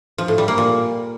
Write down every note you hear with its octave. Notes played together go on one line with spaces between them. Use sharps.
F3
A2
G3
A#3
A#2